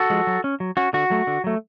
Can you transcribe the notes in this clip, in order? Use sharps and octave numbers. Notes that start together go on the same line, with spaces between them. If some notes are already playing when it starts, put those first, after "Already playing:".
Already playing: F#4 A4
F3 G#3
F#3
C#4
F#3
C#4 F#4
D3 F#4
F#3 A3
D3
F#3 A3